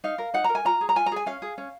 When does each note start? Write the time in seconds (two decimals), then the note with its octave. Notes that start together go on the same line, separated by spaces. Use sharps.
0.04 D#4 F5
0.18 A#4
0.34 D#4 F#5
0.44 A#4 A#5
0.55 G#5
0.65 F4 A#5
0.81 G#4
0.89 A#5
0.96 F4 G#5
1.06 A#5
1.12 G#4 G#5
1.26 C#4 F5
1.42 G#4
1.58 C#4